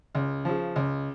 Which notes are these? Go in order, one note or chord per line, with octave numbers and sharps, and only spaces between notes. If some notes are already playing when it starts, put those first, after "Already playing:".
C#2
C#3 F3
C#2